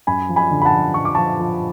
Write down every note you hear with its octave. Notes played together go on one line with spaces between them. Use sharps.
F#2 G#5 B5
F3
G#5 B5
D3
B5
F#5 A5
F3
F3 C#6
D6
F3 A5 C#6
F3